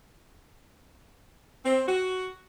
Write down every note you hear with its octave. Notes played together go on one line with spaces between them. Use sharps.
C4
F#4